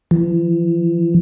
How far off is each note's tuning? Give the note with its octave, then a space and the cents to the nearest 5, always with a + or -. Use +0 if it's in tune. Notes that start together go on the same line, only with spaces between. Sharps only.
E3 +45